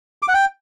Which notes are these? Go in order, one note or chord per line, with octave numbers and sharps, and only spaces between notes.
D6
F#5
G5